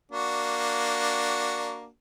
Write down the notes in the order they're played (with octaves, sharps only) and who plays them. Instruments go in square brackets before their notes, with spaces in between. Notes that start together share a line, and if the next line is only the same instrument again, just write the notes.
[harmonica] A#3 D4 F#4